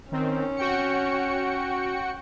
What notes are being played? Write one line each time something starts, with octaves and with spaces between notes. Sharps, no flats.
D#3 C4 C#4
F#4 G5 C#7